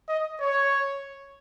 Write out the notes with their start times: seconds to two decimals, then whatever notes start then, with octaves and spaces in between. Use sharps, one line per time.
0.08 D#5
0.40 C#5